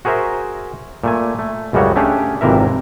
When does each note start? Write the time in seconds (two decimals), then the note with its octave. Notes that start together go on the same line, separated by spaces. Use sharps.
0.05 F#4 G#4 A#4 C5 E5
1.04 A#2 A3 G#5
1.39 A3
1.73 C#2 F#2 C#3 G3 F#4 C#5
1.96 A3 C#4 D4 G4 G#4
2.41 G#1 F2 C3 E3 A#4 E5